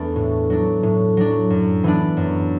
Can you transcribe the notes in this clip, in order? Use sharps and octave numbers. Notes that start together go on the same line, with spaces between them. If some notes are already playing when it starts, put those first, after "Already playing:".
Already playing: E2 A3 D4
A2
F#3 D4
A2
F#3 D4
F#2
E3 B3 D4
F#2